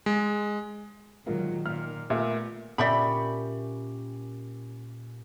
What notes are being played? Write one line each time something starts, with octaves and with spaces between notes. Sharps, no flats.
G#3
A#2 D#3 F#3 G#3 F4 A#4
A#2 F6
A#2 A3 B3 A#4 E5
A#2 C#4 G4 D5 E5 B5